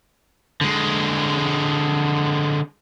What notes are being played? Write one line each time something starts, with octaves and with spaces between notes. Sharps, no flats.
D3 G#3